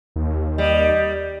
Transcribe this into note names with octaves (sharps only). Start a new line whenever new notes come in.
D#2
G3 D#5